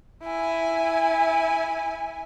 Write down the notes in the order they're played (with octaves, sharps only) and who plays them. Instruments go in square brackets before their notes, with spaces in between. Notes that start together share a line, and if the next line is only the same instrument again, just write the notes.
[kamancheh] E4 G#5